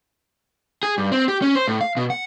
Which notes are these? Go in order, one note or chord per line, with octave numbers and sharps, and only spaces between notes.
G#4
G2
C4
G4
C#4
C5
A2
F5
B2
F#5